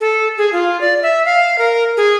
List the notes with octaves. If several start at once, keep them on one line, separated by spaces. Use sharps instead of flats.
A4
G#4
F4
D5
E5
F5
A#4
G#4